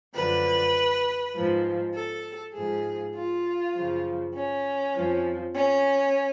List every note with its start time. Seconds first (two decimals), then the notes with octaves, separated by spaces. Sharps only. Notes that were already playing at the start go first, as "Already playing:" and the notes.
0.14 F#2 D3 F3 B4
1.35 G#2 F3
1.95 A4
2.55 G#2 F3 G#4
3.15 F4
3.75 F#2 C#3 F3
4.34 C#4
4.95 F2 F3
5.55 C#4